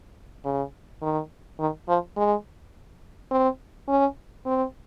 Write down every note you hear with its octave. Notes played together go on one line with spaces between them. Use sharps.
C#3
D#3
D#3
F3
G#3
C4
C#4
C4